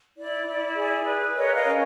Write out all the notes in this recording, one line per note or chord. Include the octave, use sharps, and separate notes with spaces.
E4 D5
E4
G#4
B4
A#4 C#5 D#5
D#5 F5
C#4